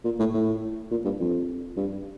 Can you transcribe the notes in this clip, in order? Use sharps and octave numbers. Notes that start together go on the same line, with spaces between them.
A#2
A2
A2
A#2
G2
F2
G2